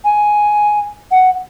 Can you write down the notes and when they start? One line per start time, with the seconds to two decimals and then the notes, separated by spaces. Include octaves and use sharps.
0.04 G#5
1.11 F#5